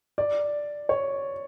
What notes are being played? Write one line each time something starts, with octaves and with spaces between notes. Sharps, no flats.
D5
C#5